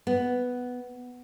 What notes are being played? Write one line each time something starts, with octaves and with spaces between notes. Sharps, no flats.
B3